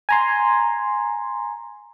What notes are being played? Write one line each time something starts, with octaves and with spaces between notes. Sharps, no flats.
G#5 A#5 C6